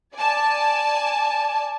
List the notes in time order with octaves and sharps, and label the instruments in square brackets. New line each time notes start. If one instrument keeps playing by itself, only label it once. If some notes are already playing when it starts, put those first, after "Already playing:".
[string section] D5 G#5 A5